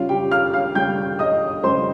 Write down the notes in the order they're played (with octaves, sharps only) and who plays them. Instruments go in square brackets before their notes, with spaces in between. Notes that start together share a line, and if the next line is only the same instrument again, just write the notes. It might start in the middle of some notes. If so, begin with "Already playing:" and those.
Already playing: [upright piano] C#3 G3 C#4 F4 F5
G4 G5
F5 F6
F5 F6
C#3 G3 C#4 G5 G6
D#5 D#6
C#3 G3 C#4 C5 C6